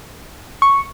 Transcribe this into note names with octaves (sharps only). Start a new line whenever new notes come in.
C#6